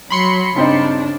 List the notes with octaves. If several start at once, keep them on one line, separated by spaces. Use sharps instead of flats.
F#3 B5 C6 C#7
G2 C#3 C4 D4 D#4